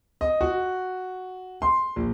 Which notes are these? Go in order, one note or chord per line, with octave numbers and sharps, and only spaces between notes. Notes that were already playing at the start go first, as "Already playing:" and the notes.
D#5
F#4
C6
A#1